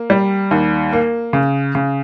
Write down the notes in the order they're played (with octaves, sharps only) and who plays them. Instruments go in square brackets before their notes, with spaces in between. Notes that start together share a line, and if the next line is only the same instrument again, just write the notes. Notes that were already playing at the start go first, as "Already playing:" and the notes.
Already playing: [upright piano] A#3
G3
D#2
A#3
C#3
C#3